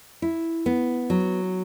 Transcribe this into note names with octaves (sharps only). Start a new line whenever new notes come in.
E4
B3
F#3